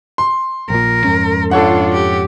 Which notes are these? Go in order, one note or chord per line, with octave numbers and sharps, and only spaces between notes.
C6
A#1 A#2 A#4
F2 G#2 C#4
D4 F4 A4 C#5 F#5
G4